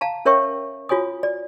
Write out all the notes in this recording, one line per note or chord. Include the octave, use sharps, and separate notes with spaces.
F5 A5 A#5
C#4 A#4 C#5 E5 G5 C#6
F4 F#4 C#5 G#5 D#6
D5